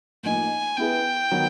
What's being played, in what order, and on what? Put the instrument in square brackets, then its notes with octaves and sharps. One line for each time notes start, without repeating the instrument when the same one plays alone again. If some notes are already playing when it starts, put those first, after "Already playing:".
[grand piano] A2 F3 A#3 D#4 [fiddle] G#5
[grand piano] B3 E4 G#4 B4 [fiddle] G5
[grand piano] D#3 F#3 B3